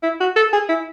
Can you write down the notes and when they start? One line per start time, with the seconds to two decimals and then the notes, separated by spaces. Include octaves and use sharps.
0.03 E4
0.20 F#4
0.36 A4
0.53 G#4
0.69 E4